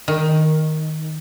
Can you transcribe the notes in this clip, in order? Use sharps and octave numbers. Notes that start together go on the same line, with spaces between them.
D#3